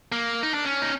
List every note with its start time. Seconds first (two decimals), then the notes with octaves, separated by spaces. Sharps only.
0.12 A#3
0.43 D#4
0.54 D4
0.65 C#4
0.82 D#4